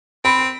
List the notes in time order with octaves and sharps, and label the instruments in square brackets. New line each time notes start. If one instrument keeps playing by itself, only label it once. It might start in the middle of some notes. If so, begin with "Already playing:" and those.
[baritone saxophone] C4 [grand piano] B5